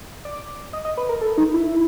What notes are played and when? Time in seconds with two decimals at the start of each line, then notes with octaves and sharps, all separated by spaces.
0.25 D5
0.73 D#5
0.85 D#5
0.97 B4
1.09 A#4
1.21 A4
1.38 D#4
1.54 E4